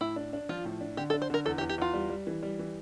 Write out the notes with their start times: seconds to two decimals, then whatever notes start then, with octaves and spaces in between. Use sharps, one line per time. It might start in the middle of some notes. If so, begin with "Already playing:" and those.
0.01 A2 E4
0.16 D4
0.33 D4
0.49 F3 F4
0.65 A2
0.81 D4
0.97 D3 G4
1.10 A4
1.14 D4
1.22 C5
1.30 D3 A#4
1.46 E2 A4
1.58 G4
1.61 E2
1.69 G4
1.78 E2 F4
1.94 G3
2.10 G3
2.27 E3
2.43 G3
2.59 E3